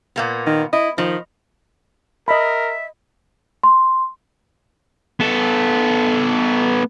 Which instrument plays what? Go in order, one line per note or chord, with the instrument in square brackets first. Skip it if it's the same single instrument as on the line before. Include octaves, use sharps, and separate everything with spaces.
[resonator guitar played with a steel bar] A#2 A#3 B3
[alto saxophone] D#3
[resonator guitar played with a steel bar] E4 [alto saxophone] D#5
[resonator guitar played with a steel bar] D#3 [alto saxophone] F3
[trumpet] A#4 [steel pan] D#5 B5 [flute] E5
[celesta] C6
[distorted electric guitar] B3 A4